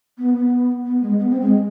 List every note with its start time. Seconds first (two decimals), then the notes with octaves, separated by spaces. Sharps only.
0.18 B3
0.35 B3
0.85 B3
1.02 G#3
1.19 B3
1.30 C4
1.41 G#3